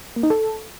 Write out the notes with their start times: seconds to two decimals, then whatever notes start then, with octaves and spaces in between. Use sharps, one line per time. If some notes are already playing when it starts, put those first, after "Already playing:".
0.16 A#3
0.23 D#4
0.30 A4